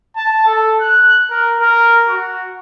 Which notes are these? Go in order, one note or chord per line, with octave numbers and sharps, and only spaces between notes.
A5
A4
F#6
A#4
A#4
F#4